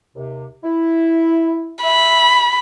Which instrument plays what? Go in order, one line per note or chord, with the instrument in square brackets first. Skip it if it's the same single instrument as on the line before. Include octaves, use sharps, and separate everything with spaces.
[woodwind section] D#2 C3
E4
[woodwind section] E5 [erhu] B5